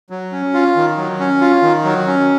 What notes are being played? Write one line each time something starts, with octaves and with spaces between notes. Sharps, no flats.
F#3
C#4
F4
D#3
F#3
C#4
F4
D#3
F#3
C#4